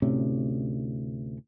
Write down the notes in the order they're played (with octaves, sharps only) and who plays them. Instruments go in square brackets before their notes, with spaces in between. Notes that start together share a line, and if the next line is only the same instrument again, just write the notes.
[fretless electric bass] D2 A2 C3 C#4